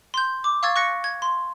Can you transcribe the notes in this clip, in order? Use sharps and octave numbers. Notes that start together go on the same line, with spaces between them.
C6 G6
D6
F5 C#6 E6 G#6 A6
C#6 F#6 A#6 C#7
G#6
C6